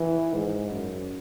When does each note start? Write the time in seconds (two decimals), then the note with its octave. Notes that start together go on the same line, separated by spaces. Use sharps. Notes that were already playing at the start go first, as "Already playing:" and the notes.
Already playing: E3
0.34 G#2
0.71 F#2